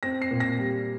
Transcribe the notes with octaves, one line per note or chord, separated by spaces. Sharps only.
C4 A#6
C7
A#2
A#6
G3